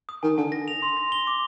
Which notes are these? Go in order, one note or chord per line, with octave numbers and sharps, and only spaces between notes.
D#6
D#3 G#5
D3 G#5
A#6
F7
C6
A#6
G7
D6